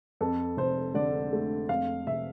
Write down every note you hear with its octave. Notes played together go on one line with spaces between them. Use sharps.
F2 A4
F1 C5
D3 D5
A3
F2 F5
F1 E5